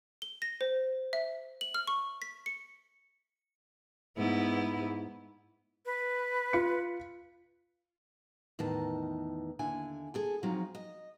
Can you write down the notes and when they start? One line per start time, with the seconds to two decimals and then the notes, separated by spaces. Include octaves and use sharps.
0.22 G7
0.42 A#6
0.61 C5
1.13 E5
1.61 F#7
1.74 F6
1.87 C#6
2.22 B6
2.46 C#7
4.17 G#2 B3 E4
5.86 B4
6.53 F4 C#7
8.59 E2 A2 D#3 D#4 D#5 A5
9.59 D#2 D3 E4 G#5
10.14 G#4 A4 G#5
10.43 F3 F#3 C4 D#4 F4
10.75 D#5